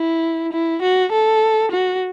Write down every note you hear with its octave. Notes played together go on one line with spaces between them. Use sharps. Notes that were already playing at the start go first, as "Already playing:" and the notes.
Already playing: E4
E4
F#4
A4
F#4